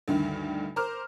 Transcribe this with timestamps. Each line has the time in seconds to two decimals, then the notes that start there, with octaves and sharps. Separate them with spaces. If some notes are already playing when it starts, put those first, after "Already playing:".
0.08 D2 G2 D#3
0.76 A#4 C5 A#5 D6 F6